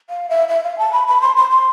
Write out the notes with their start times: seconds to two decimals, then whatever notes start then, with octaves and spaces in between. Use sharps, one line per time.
0.10 F5
0.29 E5
0.48 E5
0.64 F5
0.79 A5
0.93 B5
1.07 B5
1.21 C6
1.36 C6
1.51 C6